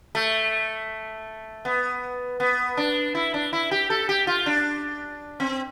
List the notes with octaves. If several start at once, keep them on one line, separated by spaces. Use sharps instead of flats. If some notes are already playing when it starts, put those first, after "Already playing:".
A3
B3
B3
D4
E4
D4
E4
G4
A4
G4
F4
D4
C4